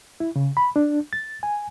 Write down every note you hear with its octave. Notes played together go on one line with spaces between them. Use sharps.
E4
C#3
B5
D4
A6
G#5